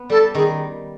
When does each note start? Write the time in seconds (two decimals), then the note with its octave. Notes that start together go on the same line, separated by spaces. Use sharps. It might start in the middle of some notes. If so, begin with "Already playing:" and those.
Already playing: B3
0.10 G3 A4
0.35 D#3 G#4